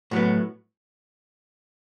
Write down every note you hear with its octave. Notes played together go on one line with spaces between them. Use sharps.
A2 F#3 B3